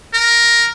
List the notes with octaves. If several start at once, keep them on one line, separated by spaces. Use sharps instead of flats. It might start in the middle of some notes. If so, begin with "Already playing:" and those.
A#4